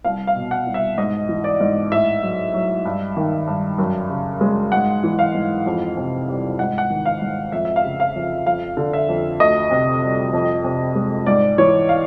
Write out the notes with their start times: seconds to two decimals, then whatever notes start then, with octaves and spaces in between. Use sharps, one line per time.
0.04 C2 F5
0.27 F5
0.36 B2
0.51 F#5
0.67 C2
0.74 E5
0.98 G#2 D#5
1.29 E3
1.44 D5
1.60 G#2
1.91 A2 E5
2.23 F#3
2.54 F#3
2.85 G2
3.17 D#3
3.47 G2
3.78 F#2
4.10 C#3
4.41 G#3
4.72 G#2 F#5
5.04 E3
5.19 F5
5.34 G#2
5.66 F2
5.97 C3
6.28 G3
6.59 G#2 F#5
6.78 F#5
6.90 D#3
7.06 F5
7.22 G#2
7.52 F2 E5
7.65 E5
7.76 F5
7.84 C#3
8.00 F5
8.15 F2
8.47 F2 F5
8.77 D3
8.93 E5
9.09 F2
9.40 D2 D#5
9.71 C3
10.02 G3
10.33 F2
10.64 C3
10.95 G#3
11.26 G#2 D5
11.58 E3 C#5
11.89 F5